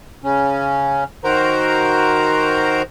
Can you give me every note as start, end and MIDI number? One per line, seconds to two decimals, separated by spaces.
0.24 1.04 49
0.24 1.04 61
1.24 2.82 51
1.24 2.82 66
1.24 2.82 70
1.24 2.82 72
1.24 2.82 82